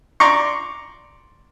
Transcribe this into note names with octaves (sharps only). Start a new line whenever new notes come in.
D5 A#5 C6 C#6